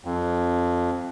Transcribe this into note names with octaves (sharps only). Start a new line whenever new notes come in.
F2